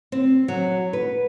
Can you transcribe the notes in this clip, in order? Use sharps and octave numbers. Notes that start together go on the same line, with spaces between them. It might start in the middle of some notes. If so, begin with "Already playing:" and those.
C4
F#3
B4